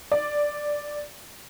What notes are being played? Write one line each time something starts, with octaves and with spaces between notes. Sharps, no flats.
D5